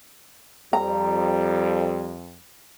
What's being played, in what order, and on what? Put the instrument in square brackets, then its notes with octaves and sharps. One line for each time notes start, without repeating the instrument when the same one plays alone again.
[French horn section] F2 [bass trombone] G3 [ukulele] A#5